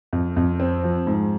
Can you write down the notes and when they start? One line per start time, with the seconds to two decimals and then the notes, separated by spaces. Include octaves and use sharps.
0.13 F2
0.36 F2
0.60 C4
0.84 F3
1.07 G#2